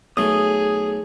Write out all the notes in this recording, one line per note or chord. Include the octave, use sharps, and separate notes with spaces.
B1 A3 G#4 D#6